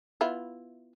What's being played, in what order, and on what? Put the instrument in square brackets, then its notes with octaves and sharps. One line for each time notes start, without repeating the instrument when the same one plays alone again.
[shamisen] B3 E4 F4